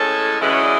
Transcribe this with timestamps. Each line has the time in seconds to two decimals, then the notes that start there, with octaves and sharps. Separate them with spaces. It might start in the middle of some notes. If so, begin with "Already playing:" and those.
Already playing: A2 G#3 C#4 A4
0.41 F#2 E3 G#3 C#4 B4
0.52 C#5
0.62 D5